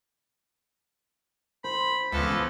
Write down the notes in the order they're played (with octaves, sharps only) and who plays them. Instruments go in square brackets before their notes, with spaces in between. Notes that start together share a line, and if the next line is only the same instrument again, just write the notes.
[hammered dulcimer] C5 [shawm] B5
[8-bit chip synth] C#2 [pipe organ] E3 F3 B3 [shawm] A4